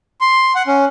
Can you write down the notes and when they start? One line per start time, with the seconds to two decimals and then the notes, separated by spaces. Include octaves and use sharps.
0.21 C6
0.55 F#5
0.67 C#4